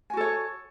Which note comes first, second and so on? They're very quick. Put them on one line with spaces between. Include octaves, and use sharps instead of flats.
G#5 F#4 A4 C#5